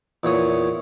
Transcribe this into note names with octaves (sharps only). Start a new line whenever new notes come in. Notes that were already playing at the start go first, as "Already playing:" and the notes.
E2 A#2 C#5 D#6